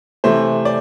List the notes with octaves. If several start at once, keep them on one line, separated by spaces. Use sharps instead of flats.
C3 E3 A3 C5
D5